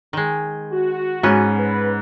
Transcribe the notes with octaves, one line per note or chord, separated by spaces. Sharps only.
D#3 G#3
F#4
G#2 B3 C#4
B4